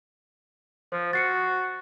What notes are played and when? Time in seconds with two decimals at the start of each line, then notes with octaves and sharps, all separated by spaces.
0.92 F3 C5
1.13 F#4 A6 C7 C#7